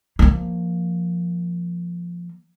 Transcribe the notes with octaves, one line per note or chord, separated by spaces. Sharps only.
F3 A#3